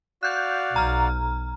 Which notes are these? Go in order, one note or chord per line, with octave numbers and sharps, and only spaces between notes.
F#4 D5 F5 F#6 G6
B1 A#5 F6